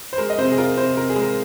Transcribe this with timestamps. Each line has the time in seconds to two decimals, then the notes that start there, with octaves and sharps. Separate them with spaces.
0.13 C5
0.18 G#3 A#4
0.30 D#5
0.38 C3 C5
0.52 G#4
0.58 F4 A#4
0.77 C3 C5
0.97 C3 A#4
1.10 G#4
1.16 G#3
1.22 A#4